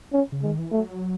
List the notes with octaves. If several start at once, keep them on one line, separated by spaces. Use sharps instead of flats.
C#4
C#3
D#3 G#3
E3
F#3 A3